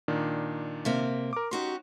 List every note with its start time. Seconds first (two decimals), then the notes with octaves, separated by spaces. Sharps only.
0.08 A#2 D#3 D4
0.85 C3 A#3
1.33 A#4 D6
1.51 C#4 D#4 F#4 G4 C6